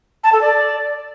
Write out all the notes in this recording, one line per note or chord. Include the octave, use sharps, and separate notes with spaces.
A5
A4
D5